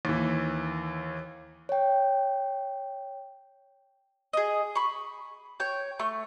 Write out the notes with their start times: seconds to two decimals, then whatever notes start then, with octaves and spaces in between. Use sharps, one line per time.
0.05 D#2 E3
1.69 C#5 G5
4.33 G#4 D#5
4.75 B5 C#6
5.60 C#5 G5
5.99 A3 C#6